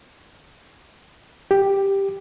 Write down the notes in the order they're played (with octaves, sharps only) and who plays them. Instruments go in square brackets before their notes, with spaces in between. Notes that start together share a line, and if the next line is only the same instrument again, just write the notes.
[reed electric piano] G4